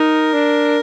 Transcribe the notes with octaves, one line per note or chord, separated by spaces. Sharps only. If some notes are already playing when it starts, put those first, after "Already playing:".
Already playing: D#4 A#4
D4